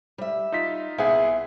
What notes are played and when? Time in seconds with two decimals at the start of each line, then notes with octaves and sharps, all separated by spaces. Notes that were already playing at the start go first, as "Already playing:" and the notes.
0.18 G3 E5
0.52 D#4 F4 B6
0.98 C2 B3 G#4 E5 F5